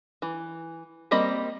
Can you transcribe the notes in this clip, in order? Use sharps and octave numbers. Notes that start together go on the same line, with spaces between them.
E3
G3 A#3 C4 D#5 B5